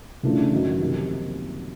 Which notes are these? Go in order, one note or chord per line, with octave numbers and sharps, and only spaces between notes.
C#3 E3 A3 D4 F4
F#2 D#3 F#3
C3 F3 A#3 D#4 G4